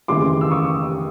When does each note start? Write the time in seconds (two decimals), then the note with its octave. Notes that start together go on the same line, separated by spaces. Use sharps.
0.08 F1 D#2 C#3 E3 G3 C6 D6
0.41 E6
0.51 C#6 D#6